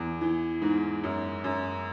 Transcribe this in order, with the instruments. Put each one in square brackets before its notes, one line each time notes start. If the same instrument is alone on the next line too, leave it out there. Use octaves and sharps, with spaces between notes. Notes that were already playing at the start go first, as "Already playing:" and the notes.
Already playing: [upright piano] E2
E3
G#2
F#2
F#2